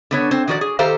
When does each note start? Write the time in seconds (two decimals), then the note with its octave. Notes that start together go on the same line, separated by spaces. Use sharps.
0.11 D3 B3 C#5
0.31 C4 C5
0.47 D#3 F3 F#4 B4 D5
0.61 G#4
0.79 D#3 G4 A4 C5 F5 A#5